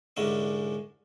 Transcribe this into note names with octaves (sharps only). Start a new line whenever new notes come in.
C2 G#2 D3 C#4 E5